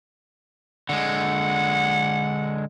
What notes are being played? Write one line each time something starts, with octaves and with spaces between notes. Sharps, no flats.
D3 G#3 F#5